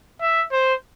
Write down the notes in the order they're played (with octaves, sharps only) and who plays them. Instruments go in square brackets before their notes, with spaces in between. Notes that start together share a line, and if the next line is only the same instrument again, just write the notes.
[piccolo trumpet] E5
C5